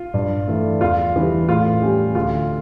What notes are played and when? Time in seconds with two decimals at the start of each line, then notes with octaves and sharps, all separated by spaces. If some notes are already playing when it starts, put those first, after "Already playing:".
Already playing: F4
0.14 G2
0.47 E3 A3
0.81 E2 F4
1.14 C#3 E3 G3
1.48 A2 F4
1.82 G3 C#4 G4
2.15 D2 F4